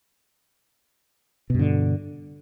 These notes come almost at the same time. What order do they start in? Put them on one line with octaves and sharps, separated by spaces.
B2 G2 D3